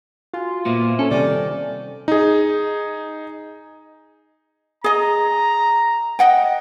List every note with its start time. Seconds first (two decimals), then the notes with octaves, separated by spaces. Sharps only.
0.33 F4 F#4 G#5
0.65 A#2 A#3 B3 C5 E5 D6
0.99 C#4 A4
1.11 C3 D#3 G3 A4 D5 G#5
2.08 D#4 G#4
4.84 G#4 D#5 A#5
6.19 D#5 F#5 G5